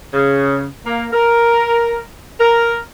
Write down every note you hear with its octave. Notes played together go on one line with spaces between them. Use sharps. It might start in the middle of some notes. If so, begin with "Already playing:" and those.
C#3
A#3
A#4
A#4